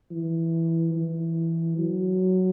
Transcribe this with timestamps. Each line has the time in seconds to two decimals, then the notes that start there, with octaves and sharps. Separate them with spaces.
0.11 E3
0.95 E3
1.78 F#3